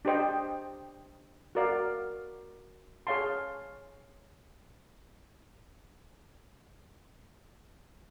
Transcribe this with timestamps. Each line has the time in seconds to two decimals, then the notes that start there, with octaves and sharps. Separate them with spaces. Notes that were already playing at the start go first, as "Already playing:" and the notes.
0.05 D4 G4 C5 D#5 G5
1.55 F#4 A#4 D5 F5
3.07 G#4 C#5 F5 A5 C6